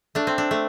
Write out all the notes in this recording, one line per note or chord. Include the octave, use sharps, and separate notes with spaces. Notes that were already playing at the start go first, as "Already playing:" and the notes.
A3 D4
C4
D4
A3